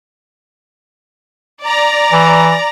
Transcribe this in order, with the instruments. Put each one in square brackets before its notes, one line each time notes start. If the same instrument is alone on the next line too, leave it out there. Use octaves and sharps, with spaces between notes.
[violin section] D5 A#5
[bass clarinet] E3